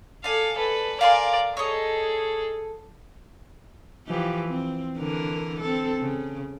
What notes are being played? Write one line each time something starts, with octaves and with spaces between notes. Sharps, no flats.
A4 D5 F5 G#5
A4 B4
A#4 D5 F5 G#5 C6
G#4 A4 C#5 D#5
E3 F3 G4
C4
D3 E3 A#4
C4 A4
C#3